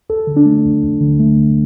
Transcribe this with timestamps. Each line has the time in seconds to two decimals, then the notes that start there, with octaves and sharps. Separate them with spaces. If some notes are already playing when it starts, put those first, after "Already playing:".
0.09 D2 A4
0.27 D3
0.37 D4
0.46 A3
0.65 D2
0.83 D2
1.01 D3
1.20 A3
1.38 D2